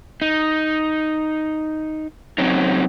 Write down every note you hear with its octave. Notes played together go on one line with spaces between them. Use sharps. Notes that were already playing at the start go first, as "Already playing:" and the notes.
D#4
F#3 C4 C#4 D#4